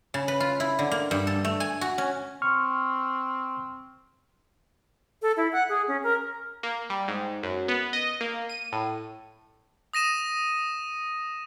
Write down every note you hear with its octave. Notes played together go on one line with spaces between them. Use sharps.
C#3
B4
F4
E4
D3
A#3
G2
A4
A3
G#5
F#4
C#4
C4 C#6 F6
A4
E4
F#5
G#4
C#4
A#4
A#3
G3
G#2
F#2
B3
D#5
A#3
D#7
A2
D#6 A#6 D#7 E7